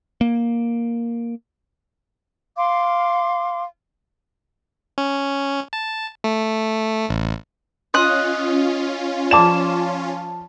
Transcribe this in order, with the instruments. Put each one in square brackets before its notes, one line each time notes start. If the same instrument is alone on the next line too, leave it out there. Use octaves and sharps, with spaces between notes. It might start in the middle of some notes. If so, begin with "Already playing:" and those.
[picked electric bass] A#3
[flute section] F5 C6 D6
[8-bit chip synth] C#4
A5
A3
A1
[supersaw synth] C#4 F4 [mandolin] D#5 D#6 F#6 [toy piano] C6
[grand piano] F3 A5 E7 [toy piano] D5 C6 D6